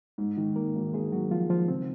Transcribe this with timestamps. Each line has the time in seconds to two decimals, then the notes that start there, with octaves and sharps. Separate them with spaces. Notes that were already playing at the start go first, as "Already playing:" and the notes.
0.18 G#2
0.37 D#3
0.56 G#2 A#3 A#4
0.75 G#1
0.93 G#1 G#3 G#4
1.12 G#1 F#3 F#4
1.31 G#1 F3 F4
1.50 D#3 F3 F4
1.68 C#2 C4